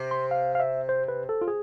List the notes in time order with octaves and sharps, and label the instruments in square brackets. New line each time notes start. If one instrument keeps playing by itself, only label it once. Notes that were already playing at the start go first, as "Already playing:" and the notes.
Already playing: [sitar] C3
[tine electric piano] C6
F5
F5
E5
C5
B4
A4
F4
G#4